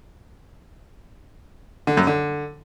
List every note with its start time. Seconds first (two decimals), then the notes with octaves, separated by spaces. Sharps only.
1.87 D3
1.97 F#2
2.07 D3